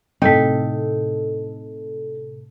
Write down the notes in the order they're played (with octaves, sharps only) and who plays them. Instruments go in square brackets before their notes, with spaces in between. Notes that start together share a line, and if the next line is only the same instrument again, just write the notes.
[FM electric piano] A2 C3 A4 [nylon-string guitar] D#4 [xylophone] G5 B6